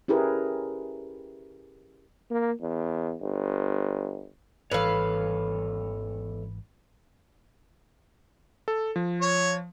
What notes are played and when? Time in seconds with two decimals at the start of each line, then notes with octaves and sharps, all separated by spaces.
0.08 C#4 E4 G4 G#4 A#4 B4
2.31 A#3
2.61 E2
3.21 G1
4.71 G#1 E2 G#2 E3 A4 B4 C#5 F5
8.68 A4
8.96 F3
9.21 C#5